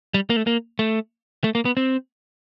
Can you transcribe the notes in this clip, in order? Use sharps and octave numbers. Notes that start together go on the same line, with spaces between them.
G3
A#3
A3
A#3
A3
A3
A#3
B3
C4